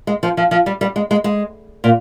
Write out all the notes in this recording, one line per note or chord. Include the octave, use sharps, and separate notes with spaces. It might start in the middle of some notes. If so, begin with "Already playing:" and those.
G#3
F3
F3
F3
G3
G3
G#3
G#3
G#3
A#2